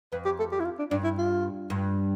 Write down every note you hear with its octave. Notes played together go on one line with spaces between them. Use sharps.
F2 B4
G4
A4
G4
E4
F4
D4
G2 D4
E4
F4
G2